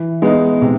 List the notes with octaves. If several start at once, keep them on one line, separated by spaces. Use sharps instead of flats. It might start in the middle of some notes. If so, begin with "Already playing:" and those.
Already playing: E3
G#3 B3 D#4
C3